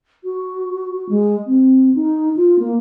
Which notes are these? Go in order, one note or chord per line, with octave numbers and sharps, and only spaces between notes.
F#4
G#3
C4
D#4
F4
A#3